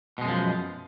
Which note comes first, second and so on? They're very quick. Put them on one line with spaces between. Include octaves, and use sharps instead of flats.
B2 G#3 F#2 F3